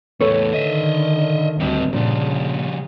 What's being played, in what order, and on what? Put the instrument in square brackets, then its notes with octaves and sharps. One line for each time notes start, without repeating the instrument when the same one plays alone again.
[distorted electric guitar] E2 A2 [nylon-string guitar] A4 B4 C#5
[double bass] D3 D#3 [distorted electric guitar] D#5 E5
[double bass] G1 D2 [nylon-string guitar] G2 [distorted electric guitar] C4 F#4
[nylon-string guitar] A#2 D4 [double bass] C#3 [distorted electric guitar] F3 G3